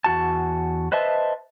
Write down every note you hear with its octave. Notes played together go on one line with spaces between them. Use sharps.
E2 F#4 A5
B4 C5 D#5 E5 A5